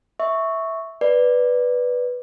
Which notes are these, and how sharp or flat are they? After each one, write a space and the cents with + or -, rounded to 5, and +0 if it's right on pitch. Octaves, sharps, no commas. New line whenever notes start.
E5 -10 C#6 +0
B4 +0 D5 +0